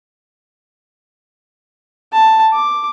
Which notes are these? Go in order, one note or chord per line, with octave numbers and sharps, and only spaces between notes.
A5
D6